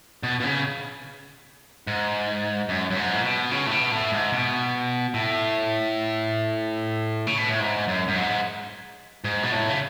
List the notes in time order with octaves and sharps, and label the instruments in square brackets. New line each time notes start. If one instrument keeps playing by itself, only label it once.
[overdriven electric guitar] B2
B2
C#3
G#2
F#2
F#2
G#2
A2
B2
C#3
A2
B2
A2
G#2
B2
A2
C#3
B2
A2
G#2
F#2
F#2
G#2
G#2
B2
A2
C#3